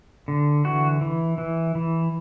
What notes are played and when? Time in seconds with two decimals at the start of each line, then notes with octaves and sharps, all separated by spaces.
0.28 D3
0.65 E3 F#4
1.01 E3
1.38 E3
1.75 E3